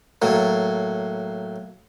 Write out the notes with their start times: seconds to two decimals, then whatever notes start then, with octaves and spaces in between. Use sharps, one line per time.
0.22 A2 F#3 A#3